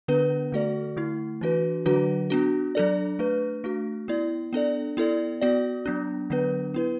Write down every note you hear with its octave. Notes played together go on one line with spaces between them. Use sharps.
D3 B3 D4 B4
D3 A3 F#4 A4 D5
D3 A3 E4
E3 D4 F#4 B4
D3 F#3 D4 F#4 B4
B3 D4 F#4
F#3 D4 A4 D5
A3 D4 B4
A3 D4 F#4
B3 E4 D5
B3 D4 A4 D5
B3 E4 A4 D5
B3 F#4 D5
F#3 B3 D4
D3 F#3 B3 D4 B4
B3 E4 B4